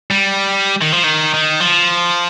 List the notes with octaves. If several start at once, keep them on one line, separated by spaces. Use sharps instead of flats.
G3
D#3
F3
D#3
D#3
F3